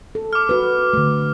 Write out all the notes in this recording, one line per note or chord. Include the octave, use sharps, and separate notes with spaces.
A4
D6 F6
F#4 B4
D3 A3